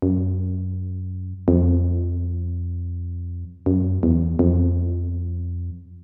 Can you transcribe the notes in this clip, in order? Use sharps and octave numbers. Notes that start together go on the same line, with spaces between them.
F#2
F2
F#2
E2
F2